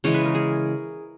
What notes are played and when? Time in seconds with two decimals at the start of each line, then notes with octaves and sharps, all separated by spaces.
0.04 C#3 E3 G#3 C#5
0.14 B4
0.25 A#4
0.35 G#4